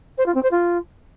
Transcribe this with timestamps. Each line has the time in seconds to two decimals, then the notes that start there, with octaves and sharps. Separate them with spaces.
0.17 C5
0.26 F4
0.34 C4
0.42 C5
0.51 F4